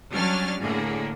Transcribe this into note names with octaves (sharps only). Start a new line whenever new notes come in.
F#3 G3 C#4 D4 F6 A6
A2 D3 A#3 G#4